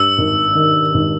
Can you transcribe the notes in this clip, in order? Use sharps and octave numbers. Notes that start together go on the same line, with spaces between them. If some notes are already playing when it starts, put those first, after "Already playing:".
Already playing: G2 E6
G#1
D#3
G#1